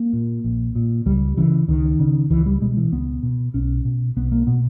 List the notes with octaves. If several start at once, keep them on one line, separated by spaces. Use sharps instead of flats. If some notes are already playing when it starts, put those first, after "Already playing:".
Already playing: A#3
A#2
A#1
A#2
C#2 G3
C#3 E3
C#2 D#3
C#3
C#2 E3
G3
B2 G#3
E3
C#2 B3
B2
B1 C#4
B2
B1 B3
A#3
B2 B3